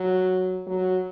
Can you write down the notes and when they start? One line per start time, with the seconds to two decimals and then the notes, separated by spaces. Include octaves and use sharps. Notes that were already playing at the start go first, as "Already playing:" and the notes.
Already playing: F#3
0.67 F#3